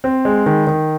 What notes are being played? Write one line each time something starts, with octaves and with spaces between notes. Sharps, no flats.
C4
G#3
D#3
D#3